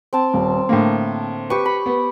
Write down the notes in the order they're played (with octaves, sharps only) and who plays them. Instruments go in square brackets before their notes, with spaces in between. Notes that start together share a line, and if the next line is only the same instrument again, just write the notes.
[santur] C4 A5
[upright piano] D#1
A2 D3 A#3
[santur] G4 C#6 [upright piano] B4
[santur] B5
[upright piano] B3